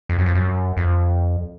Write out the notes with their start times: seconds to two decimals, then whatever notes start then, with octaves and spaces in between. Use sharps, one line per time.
0.09 F2
0.18 F#2
0.26 F2
0.35 F#2
0.77 F2